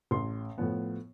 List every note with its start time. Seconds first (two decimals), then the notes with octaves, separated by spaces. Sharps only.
0.11 A1 C6
0.58 A2 F3 B3